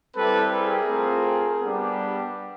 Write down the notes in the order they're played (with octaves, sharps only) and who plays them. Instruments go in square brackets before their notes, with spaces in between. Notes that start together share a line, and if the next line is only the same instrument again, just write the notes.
[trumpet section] G3 C4 E4 G4 A4 B4
G#4 A#4
A3 C4 F4
G3 B3 D4 G4